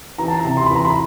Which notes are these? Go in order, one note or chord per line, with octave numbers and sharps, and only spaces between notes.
E3 A#5
A5
C3 A#5
C6
E3 B5
A#5
B5